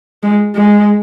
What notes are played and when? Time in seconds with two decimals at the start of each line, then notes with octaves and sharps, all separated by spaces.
0.23 G#3
0.55 G#3